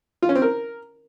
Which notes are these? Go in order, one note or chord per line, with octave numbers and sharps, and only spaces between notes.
F4
C#4
C4
A#4